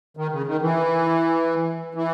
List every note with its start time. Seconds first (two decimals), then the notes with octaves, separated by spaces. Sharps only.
0.17 D#3
0.32 C#3
0.47 D#3
0.61 E3
1.95 E3